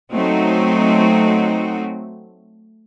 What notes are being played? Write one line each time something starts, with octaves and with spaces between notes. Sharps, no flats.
F#3 A3 C4 D#4 F#4